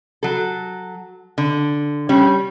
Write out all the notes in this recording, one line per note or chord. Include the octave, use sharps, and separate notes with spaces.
F#3 A4
D3
G3 C#4